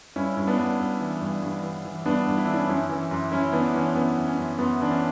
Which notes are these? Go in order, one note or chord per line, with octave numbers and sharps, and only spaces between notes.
G2 C#4 E4
G2
B3 D4
G2
G2
E3
G2
G2
E3
E3
G2 B3 D4
G2
E4
E3 D4
C#4 E4
F#2 C#4 E4
E3
F#2
F#2 C#4 E4
E3 B3 D4
E3 C#4
F#2 B3
F#2
C#4
F#2
F#2 B3
E3 D4
C#4